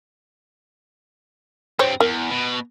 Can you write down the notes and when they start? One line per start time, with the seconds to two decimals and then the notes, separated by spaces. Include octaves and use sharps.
1.79 G2 C4 C5 C#5
2.00 E2 A#4
2.30 B2